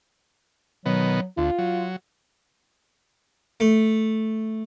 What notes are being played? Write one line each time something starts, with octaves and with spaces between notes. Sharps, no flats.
B2 D#3 F#3 B3
D2 F4
F#3
A3